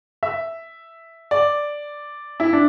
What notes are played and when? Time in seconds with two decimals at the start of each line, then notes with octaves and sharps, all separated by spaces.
0.23 E5
1.31 D5
2.40 E4
2.53 D4